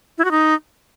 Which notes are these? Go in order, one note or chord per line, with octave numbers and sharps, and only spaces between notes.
E4
F#4
D#4